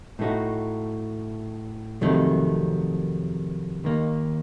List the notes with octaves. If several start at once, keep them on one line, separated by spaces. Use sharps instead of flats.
A2 A3 D#4 F#4
F2 C3 D#3 F#3 A3
D#2 D#3 A#3